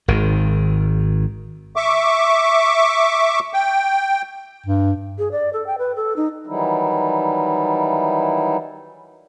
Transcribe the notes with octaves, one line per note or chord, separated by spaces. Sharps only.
G#1 D#3
E5 C#6 D6
G5
G2
G#4
D5
A4
G5
B4
A4
D#4
D#3 E3 F#3 G3 D#4 E4